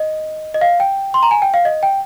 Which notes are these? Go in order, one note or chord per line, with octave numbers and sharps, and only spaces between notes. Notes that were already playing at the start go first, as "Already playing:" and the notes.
Already playing: D#5
D#5
F5
G5
C6
A#5
G#5
G5
F5
D#5
G5